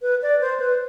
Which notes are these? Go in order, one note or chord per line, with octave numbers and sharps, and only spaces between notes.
B4
D5
C5
B4